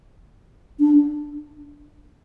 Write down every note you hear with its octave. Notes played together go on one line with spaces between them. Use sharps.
D4